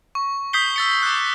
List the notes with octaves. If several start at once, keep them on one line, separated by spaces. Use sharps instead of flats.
C#6
D#6 G6 B6 C7 G7
E6 A6 C#7
D6 F#6